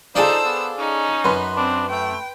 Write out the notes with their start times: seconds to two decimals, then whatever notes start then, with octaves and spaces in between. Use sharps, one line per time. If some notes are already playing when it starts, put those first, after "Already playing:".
0.15 D4 D#4 F4 G#4 A4 C5 A5 E6
0.45 B3
0.79 C#4 D#4
1.25 F#2 B4 C6
1.56 C4 D4
1.90 A3 G5